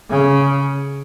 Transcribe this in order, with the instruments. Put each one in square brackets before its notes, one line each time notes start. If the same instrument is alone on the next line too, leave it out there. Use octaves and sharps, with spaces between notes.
[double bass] C#3